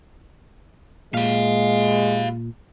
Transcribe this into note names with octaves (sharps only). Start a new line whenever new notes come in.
A#2 G#3 G4 F5